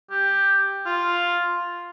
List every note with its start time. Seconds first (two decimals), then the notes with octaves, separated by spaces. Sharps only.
0.11 G4
0.86 F4